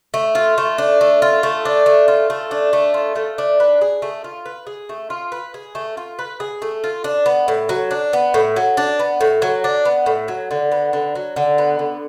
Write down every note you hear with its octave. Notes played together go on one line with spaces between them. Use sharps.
A3
F4
A3
D4
A3
F4
A3
D4
A3
F4
A3
D4
A3
F4
A3
D4
B4
G#4
A3
F4
B4
G#4
A3
F4
B4
G#4
A3
F4
B4
G#4
A3
F4
D4
B3
A2
F#3
D4
B3
A2
F#3
D4
B3
A2
F#3
D4
B3
A2
F#3
D3
B3
D3
F#3
D3
B3
D3